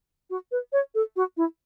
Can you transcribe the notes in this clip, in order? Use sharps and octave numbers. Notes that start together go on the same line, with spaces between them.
F#4
B4
C#5
A4
F#4
E4